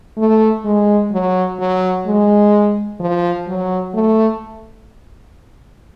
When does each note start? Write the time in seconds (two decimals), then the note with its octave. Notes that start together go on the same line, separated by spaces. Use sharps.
0.18 A3
0.65 G#3
1.11 F#3
1.59 F#3
2.06 G#3
3.00 F3
3.48 F#3
3.94 A3